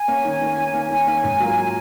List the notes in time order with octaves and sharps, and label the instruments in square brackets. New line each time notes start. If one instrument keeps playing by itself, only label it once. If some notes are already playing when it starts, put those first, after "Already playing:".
Already playing: [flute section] G#5
[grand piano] A#3 C#4
D#3
A#3 C#4
D#3
A#3 C#4
[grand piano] D#3 [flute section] G#5
[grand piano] A#3 C#4
G#2
F#3 A#3 F4 A#4